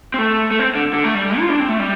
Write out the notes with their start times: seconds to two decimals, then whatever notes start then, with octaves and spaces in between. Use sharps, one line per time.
0.14 C4
0.19 A3
0.51 A3
0.59 C4
0.75 D3
0.93 D3
1.04 A3
1.15 G3
1.39 F4
1.49 D4
1.60 C4
1.69 A3
1.79 G3